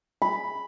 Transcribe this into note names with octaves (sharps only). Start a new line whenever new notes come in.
B5